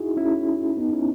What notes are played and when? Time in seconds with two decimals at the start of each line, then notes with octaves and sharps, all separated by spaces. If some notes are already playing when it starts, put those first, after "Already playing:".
Already playing: D#4 E4 F#4 G#4
0.17 C#4 E4
0.77 B3 D#4
0.93 C#4 E4